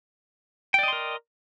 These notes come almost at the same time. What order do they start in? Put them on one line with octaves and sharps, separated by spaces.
G5 D5 D#5 C6 A#4